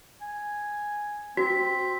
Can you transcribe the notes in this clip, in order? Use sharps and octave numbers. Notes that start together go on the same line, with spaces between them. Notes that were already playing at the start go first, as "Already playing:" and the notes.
G#5
C4 F#4 B6